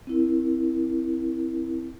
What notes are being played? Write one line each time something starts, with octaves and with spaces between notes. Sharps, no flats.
C4 E4 A#4